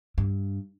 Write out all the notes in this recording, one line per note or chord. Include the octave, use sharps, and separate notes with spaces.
G2